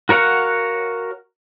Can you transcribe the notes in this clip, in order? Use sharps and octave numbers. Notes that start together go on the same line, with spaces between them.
F#4 A#4 C#5 F5 F#5